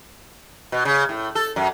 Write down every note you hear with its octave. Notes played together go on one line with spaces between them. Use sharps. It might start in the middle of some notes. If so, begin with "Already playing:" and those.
B2
C#3
A2
A4
F#2